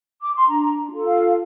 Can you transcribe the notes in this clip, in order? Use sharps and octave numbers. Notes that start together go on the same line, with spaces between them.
D6
C6
D4 A#5
F4 A4
F5